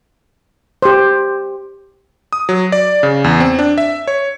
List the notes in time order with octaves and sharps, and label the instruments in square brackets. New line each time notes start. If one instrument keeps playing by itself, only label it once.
[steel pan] G4 C5
[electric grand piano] D#6
F#3
D5
C#3
E2
C4
D4
E5
C#5